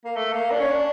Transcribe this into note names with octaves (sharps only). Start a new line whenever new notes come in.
A#3
A3
A#3
D4
C#4
D4